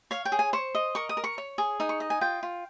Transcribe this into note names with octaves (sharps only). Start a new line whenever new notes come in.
C#5 F5
G5
G#4
G#5
C5 C#6
D#5
A#4 C#6
D#6
A#4
C#6
C#5
G#4
D#4 D#6
C#6
D#5
G#5
F4 G5
F4